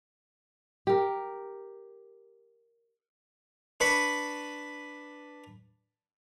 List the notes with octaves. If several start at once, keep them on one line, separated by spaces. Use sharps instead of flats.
G4 A#4
D4 B4 B5 C#6